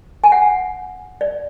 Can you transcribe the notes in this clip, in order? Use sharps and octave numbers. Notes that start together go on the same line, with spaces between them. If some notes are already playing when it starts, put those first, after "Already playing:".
G#5
F#5
D5